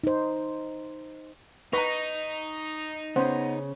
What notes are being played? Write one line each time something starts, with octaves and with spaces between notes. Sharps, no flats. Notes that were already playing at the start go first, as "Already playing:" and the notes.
D#4 C5
D#4 B4 A#5 C#6 B6
C#3 B3 C#4 C5